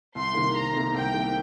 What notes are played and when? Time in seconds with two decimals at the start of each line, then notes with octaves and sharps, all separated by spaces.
0.15 C2 C6
0.34 C3 D#3 A#3
0.54 C2 A#5
0.74 C3 D#3 A#3
0.94 C2 G5
1.13 C3 D#3 A#3